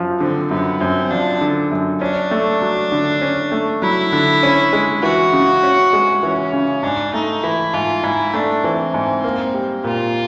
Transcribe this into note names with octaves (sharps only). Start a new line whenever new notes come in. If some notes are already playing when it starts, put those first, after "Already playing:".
Already playing: F#2 F3
D3 C4
F#2 B3
F#2 C4
F3 D4
D3
F#2
C#4 D4
A3
F#3
D3
C#4
A3
F#3 E4
D3
C#4
G#3
E3 F#4
C#3
C#4
G#3
E3 C#4
C#3
G#2 D4
A3 D#4
E3 E4
G#2 F4
G#2 E4
A3 D4
E3 C4
G#2
A#3
G3
A#2 F4